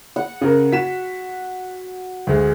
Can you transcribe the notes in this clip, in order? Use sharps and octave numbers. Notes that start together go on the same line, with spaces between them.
F#5
C#3 A#4
F#4 B6 E7
D2 G#3